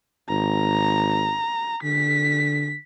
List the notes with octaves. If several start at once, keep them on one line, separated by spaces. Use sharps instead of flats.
G#1 A#5
D3 B6